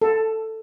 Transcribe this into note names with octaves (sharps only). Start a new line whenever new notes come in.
A4